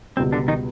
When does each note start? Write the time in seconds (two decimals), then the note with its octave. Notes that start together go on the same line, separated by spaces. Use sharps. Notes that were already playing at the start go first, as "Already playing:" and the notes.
0.17 C#2 B2 G3 C4
0.32 D3 D4
0.48 D#3 D#4